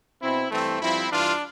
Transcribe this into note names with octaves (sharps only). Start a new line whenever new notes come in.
B2 C4 E4
G2 E3 A3 C4
G2 F3 C4 E4
G2 E3 D4 F4